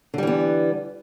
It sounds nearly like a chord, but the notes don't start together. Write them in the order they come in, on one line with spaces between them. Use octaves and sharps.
D3 G3 E3 B3